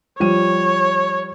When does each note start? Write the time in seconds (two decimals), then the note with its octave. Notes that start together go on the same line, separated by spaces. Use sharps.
0.20 F3 G3 C#5 D#7